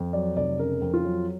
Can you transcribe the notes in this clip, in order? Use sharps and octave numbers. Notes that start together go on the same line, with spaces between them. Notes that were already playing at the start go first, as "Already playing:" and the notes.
Already playing: F2
F#3 D5
F1 D5
C#3 A#4
F2
F4
F#3